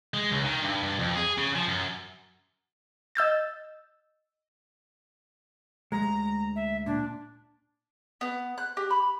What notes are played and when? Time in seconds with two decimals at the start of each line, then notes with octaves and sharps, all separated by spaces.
0.14 G#3
0.32 C#2
0.44 D#3
0.62 G2
0.82 G2
0.99 F2
1.16 G#4
1.38 C#3
1.55 F3
1.68 F#2
3.15 D#5 E6 G6 A6
5.92 D2 G#3 A#5
6.56 E5
6.86 A#2 D4
8.21 B3
8.58 F#6
8.77 G4
8.91 B5